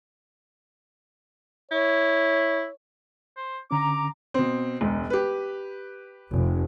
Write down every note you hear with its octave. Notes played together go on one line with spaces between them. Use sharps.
E4 C#5
C5
D3 C#4 A#5 D6
B2 C4
E1 C#2
G4 B4
F1